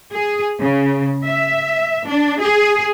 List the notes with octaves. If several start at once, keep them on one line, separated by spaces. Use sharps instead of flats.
G#4
C#3
E5
D4
G#4